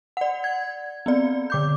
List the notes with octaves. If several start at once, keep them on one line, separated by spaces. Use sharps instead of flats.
D5 F#5
G#6
B3 C4 D5
D3 D6 G6